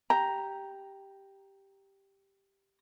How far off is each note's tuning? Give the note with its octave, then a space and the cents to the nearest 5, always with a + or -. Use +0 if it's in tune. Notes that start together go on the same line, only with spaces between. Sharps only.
G4 +0 A#5 +0